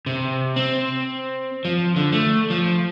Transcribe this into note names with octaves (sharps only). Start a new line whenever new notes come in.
C3
C4
F3
D3
A3
F3